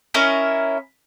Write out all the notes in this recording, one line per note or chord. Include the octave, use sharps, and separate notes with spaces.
C#4 E4 A#4 D#5